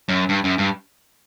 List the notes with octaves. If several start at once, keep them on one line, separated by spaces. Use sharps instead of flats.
F#2
G2
F#2
G2